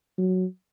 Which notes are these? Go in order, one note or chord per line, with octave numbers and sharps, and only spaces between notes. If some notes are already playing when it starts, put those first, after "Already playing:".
F#3